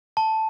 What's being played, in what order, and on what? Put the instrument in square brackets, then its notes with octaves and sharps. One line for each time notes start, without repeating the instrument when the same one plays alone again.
[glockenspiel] A5